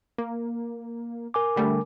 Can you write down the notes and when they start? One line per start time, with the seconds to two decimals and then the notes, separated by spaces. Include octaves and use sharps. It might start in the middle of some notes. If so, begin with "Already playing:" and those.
0.18 A#3
1.34 A#4 G#5 D6
1.56 D3 G3 A3